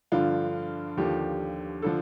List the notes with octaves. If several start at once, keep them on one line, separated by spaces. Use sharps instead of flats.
G2 D3 F3 F4
D#2 D3 F3 G4
D3 F3 A4